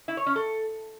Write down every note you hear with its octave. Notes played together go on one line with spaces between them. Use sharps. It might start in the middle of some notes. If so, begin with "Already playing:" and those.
E4
C#5
C#4
A4